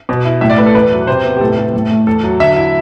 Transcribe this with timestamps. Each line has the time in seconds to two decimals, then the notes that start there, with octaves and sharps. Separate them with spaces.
0.09 B2
0.25 E4
0.41 A2 E5
0.50 D5
0.58 A3 B4
0.66 A4
0.75 E2 B4
0.91 F#3
1.07 C3 C5
1.24 B3
1.37 G4
1.41 A2 A4
1.57 A3
1.74 A2
1.91 A3
2.07 E2 A4
2.24 F#3
2.40 D3 E5
2.56 E4